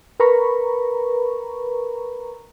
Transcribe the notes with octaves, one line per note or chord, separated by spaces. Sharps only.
A#4 B4 A#5 B5 C#6